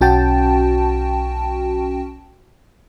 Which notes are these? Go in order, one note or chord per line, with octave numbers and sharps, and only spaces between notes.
B1 C#4 F#4 G5 A5